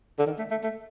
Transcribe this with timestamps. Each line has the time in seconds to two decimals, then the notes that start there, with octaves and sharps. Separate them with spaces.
0.19 D3
0.26 D#3
0.38 A3
0.51 A3
0.63 A3